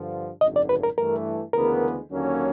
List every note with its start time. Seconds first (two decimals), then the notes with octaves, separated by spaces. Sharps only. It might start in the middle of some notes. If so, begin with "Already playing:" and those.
Already playing: G2 D3 F3
0.41 G#1 F#2 D3 D#5
0.56 D5
0.69 B4
0.83 A#4
0.98 G2 E3 A3 A#4
1.53 D2 C#3 E3 G#3 B3 A#4
2.10 D#2 D3 F#3 A#3 C#4